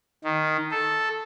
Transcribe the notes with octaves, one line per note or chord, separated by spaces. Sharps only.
D#3
A4